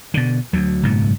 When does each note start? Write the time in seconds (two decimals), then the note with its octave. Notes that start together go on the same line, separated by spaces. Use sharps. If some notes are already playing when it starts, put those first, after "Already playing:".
0.14 B2 D3
0.53 D2 F#3
0.83 F#1 G#2 B2 F#3